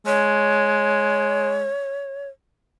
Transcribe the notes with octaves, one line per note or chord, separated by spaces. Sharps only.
G#3 C#5